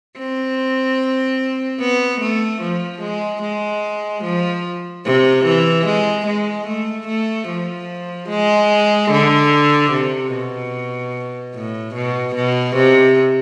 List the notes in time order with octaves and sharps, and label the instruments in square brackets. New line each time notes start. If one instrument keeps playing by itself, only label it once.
[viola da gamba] C4
B3
A3
F3
G#3
G#3
F3
C3
E3
G#3
G#3
A3
A3
F3
G#3
D3
C3
B2
A2
B2
B2
C3